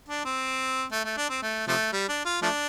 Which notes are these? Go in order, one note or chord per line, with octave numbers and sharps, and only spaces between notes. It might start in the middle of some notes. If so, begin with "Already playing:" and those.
D4
C4
A3
A3
D4
C4
A3
C3 F3 A3
G3
D4
F4
F3 A3 D4